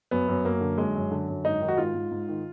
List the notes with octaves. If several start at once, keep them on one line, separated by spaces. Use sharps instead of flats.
F#2 B3
F#2
F#2 A#3
D3
F#2 G#3
F#2
D3
F#2
G#2 D#4
D#3
F#4
G#2 F4
G#2
G#2
D#3